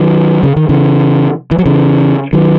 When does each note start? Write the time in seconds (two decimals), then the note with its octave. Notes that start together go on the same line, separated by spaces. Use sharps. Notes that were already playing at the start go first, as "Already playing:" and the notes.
Already playing: D#3 F#3
0.43 C#3
0.56 D#3
0.69 C#3 E3
1.51 E3
1.59 F#3
1.66 C#3 E3
2.33 D#3 F#3